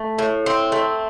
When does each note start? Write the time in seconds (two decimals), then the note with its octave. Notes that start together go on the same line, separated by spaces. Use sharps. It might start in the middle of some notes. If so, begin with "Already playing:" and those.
Already playing: A3
0.19 A2
0.46 C4
0.72 A3